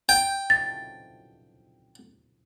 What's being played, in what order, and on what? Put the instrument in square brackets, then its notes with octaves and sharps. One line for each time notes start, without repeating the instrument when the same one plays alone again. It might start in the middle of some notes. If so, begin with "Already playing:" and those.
[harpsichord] G5
[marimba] A6